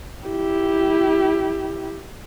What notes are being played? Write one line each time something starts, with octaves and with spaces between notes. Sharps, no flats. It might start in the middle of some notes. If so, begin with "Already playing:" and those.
E4 G4